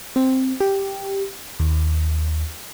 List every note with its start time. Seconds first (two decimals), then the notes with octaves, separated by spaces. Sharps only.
0.16 C4
0.60 G4
1.60 D#2